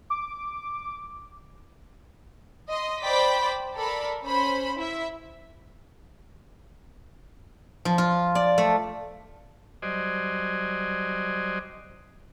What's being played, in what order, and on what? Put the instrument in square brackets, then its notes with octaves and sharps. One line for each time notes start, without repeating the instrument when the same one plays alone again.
[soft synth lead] D6
[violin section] D#5 C6
C5 D5 G5 B5 D6 B6
A4 A#4 D5 B5
C#4 C5 B5
E4 E5
[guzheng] F3
F4
D5
A3
[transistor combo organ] F#3 G3 C5 D5 D#5 G#5